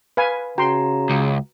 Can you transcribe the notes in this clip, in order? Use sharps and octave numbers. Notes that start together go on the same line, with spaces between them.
B4 F5 G#5
C#3 F#4 G5 A#5 C6
C#2